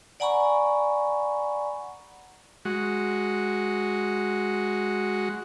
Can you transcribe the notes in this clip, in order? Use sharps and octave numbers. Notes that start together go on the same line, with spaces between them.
D5 F#5 G#5 A#5 B5 C#6
G#3 F#4